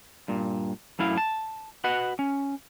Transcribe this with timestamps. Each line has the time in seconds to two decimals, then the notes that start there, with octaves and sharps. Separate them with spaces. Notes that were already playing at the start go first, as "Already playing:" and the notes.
0.28 G2 A#2
0.99 F#2 A2 E4 F5
1.18 A5
1.84 F#4 B4 D#5 F#5
2.19 C#4